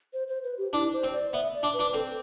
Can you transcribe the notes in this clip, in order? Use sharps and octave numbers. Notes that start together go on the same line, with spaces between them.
C5
C5
B4
G4
D4 E4
C5
C4
D5
B3 E5
D5
D4
B4
D4
C4 A4